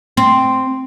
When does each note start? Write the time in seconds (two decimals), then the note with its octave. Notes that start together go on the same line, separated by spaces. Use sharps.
0.17 C4